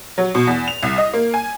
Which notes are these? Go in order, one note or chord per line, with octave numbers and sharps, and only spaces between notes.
F#3
B2
E2
F7
C2
D#5
A#3
G#5